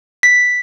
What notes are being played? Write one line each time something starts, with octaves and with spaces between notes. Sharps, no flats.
B6